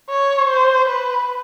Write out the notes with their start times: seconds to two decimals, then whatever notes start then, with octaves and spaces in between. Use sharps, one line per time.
0.09 C#5
0.49 C5
0.88 B4